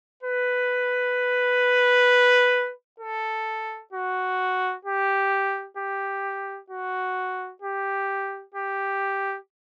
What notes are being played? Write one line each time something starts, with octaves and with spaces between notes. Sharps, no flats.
B4
A4
F#4
G4
G4
F#4
G4
G4